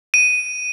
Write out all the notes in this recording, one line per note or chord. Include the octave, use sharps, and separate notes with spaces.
D#7